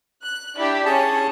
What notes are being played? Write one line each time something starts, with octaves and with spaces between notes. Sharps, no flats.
F#6
D4 E4 G4
C#4 G#4 A5